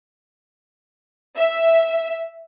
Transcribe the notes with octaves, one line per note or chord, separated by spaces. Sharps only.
E5